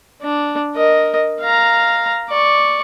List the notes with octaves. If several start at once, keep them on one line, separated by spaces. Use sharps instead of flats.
D4
A#4 D#5
F5 A#5
D5 C#6